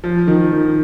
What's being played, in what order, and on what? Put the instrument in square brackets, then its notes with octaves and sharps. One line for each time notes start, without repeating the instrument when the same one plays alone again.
[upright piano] F3
D#3
D#3